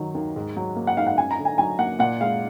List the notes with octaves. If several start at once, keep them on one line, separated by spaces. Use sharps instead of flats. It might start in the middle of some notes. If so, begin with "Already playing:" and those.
Already playing: D#3 F#3
D#2
G#2
F#3
A#3
F#5
G#2 F5
F#5
F#2 G#5
A#5
D3
G#5
F#3 G#5
A#3 F#5
A#2 F#5
G#3 F5